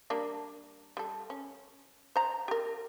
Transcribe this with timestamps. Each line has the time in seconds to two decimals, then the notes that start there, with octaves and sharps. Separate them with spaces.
0.10 G3 A#3 D4
0.97 G3 A4
1.30 C#4
2.16 C5 A#5
2.48 G4 A#4